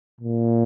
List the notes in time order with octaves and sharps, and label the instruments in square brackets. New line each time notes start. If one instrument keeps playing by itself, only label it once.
[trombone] A#2